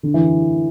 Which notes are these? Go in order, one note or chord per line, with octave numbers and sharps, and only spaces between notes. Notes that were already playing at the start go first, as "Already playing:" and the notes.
D3
E3